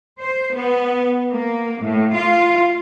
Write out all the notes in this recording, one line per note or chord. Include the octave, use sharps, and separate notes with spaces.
C5
B3
A#3
A2
F4